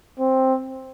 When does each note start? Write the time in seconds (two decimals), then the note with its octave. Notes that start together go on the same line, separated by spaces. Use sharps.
0.19 C4